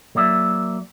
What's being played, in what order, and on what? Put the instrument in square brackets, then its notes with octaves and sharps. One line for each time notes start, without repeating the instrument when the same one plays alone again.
[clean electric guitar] F#3 A#3 D5 E5